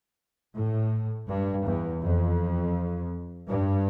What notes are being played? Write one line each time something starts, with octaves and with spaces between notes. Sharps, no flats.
A2
G2
E2
F2
G2